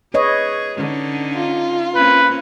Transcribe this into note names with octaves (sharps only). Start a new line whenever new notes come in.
G#4 B4 C#5 D#5
D3 C#4 D#4
F4
A#3 C4 C#4 B4